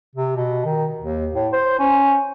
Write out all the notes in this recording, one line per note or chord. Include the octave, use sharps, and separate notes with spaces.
C3
B2
D#3
D#2
A2
C5
C#4